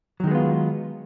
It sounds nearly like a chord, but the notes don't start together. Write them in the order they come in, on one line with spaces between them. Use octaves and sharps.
F#3 D#3 G#3 B3 F4